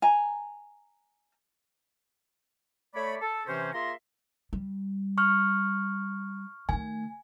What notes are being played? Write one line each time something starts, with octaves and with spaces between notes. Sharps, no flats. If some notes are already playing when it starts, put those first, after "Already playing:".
G#5 A#5
A3 C#5 D5 B5
A4
C3 E3 C#4 C5
A#3 F4 G#4 E5 A#5 C6
G3
C#6 F6 F#6
D#3 A3 G#5